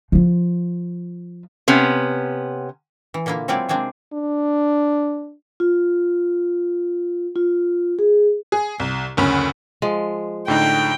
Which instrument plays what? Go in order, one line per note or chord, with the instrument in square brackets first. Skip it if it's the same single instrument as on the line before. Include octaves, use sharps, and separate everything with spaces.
[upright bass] F3 F4
[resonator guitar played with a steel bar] C3 B3 C#4
[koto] E3
A#2 D3 A#3 E4 F4
F#3 G#3 C4 E4 F4 D5
C3 G#3 A#3 C4 D4
[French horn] D4
[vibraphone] F4
F4
G#4
[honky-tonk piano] G#4
C2
F#1 D2 C#4 B5
[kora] F3 G#3
[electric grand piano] A2 D3 D#4 [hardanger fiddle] G5